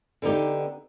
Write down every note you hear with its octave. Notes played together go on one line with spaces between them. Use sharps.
D3 B3 D#4 G4